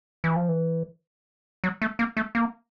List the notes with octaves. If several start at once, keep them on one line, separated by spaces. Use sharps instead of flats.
E3
F3
E3
F#3
A3
A#3
A3
A#3